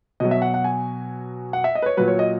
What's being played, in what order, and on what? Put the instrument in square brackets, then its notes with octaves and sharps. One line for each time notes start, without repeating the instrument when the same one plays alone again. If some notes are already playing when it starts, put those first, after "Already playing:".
[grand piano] B2 F#3 D#5
E5
F#5
F#5
G#5
F#5
E5
D#5
B4
C#5
A#2 F#3 B4
C#5
D#5